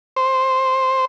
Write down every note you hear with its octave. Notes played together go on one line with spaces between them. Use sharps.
C5